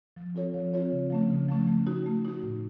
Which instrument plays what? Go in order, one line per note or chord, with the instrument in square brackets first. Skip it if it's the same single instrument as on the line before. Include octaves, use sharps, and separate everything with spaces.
[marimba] F3
C4 F4 A4 C#5
F3
C4 F4 A4 C#5
C#3
F3 A3 C#4
C#3
F3 A3 C#4
A3
D#4 F#4
A3
D#4 F#4
A2